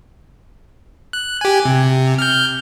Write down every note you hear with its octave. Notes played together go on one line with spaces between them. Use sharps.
F#6
G4 G#5
C3
F6 G6